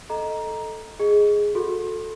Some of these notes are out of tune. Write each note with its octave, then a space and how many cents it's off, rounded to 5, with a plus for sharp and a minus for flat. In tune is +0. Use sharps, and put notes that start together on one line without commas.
A4 +0 D#5 +0 A#5 +10
G#4 +0 D#5 +0
F#4 -25 A4 +0 C6 +35